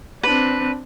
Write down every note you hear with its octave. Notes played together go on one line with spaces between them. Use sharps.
C4 D4 B4